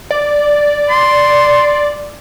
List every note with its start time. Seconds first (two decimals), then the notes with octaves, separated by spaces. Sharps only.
0.11 D5
0.90 C6